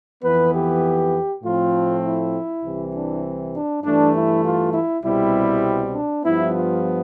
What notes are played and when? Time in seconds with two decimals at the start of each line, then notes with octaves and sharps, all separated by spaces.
0.23 F2 E3 B3 B4
0.54 G4
1.43 A2 F3 A3 C4 F4
2.03 E4
2.63 C2 C3 E3
2.94 D4
3.53 D4
3.83 G2 E3 A3 D4
4.14 E4
4.43 F4
4.73 E4
5.03 C2 B2 G3 C4 E4
5.93 D4
6.24 G2 F3 B3 E4
6.53 F4